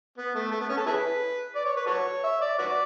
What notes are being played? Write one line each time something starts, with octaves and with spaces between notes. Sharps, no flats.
B3
A3
A3
B3
C#4
A4
E4 G#4 B4
D5
C#5
B4
F#4 A4 C#5
E5
D5
F#4 B4 D5